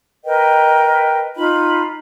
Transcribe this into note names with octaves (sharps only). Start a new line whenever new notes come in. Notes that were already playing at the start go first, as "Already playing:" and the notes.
A#4 B4 D#5 G5
D#4 F4 B5